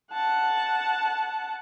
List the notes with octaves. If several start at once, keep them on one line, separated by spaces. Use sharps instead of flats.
F#5 A5